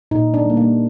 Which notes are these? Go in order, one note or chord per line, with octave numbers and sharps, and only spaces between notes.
A#2 D#4
D4
G3 A#3
A#3